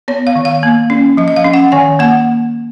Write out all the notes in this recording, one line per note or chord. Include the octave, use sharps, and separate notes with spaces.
B3 C#5
F5
D#3
F5
A#3
C#4
F3 D#5
D#5
F5
C#4
F#5
D#3 G#5
A#3 F#5